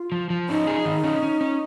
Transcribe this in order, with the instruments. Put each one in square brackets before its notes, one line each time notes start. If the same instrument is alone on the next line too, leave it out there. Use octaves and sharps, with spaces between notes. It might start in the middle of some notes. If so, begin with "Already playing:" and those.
Already playing: [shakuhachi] F4
[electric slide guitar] F3
F3
[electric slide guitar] C#4 [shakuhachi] D#4
[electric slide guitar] G#4
D#3
C#4
C#4
C#4